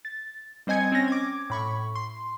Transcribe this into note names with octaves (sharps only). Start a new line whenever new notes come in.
A6
G3 C4 D#5 G#5 G#6 C#7
C4 C#4 A#6
D6 G#6
A2 B5 C#6
C6